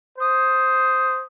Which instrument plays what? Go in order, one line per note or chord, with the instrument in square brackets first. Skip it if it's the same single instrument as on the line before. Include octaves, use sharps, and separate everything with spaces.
[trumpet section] C5 D#6